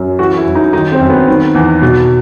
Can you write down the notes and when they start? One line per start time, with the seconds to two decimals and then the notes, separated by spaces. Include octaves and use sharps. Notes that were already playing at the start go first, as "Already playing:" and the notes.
Already playing: F#2
0.19 E3 F#4
0.37 E4
0.47 F#2
0.55 D#4
0.73 D#3 D#4
0.92 C4
1.00 F#2
1.10 B3
1.28 D#3
1.55 E2
1.82 B2